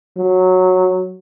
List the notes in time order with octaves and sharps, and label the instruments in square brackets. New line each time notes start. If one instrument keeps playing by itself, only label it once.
[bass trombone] F#3